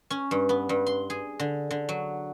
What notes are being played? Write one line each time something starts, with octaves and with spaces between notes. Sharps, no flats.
C#4
G2
B3
G2
C6
G#4
D3
D3
F#3